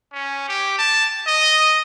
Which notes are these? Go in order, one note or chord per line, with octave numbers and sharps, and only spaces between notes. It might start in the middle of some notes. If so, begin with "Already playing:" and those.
C#4
G4
A5
D#5